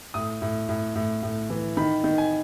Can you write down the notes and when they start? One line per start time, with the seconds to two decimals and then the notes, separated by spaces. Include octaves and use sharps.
0.14 A2 D#6
0.42 A2
0.69 A2
0.96 A2
1.23 A2
1.50 E3
1.77 D#3 B5
2.04 D#3
2.18 G#5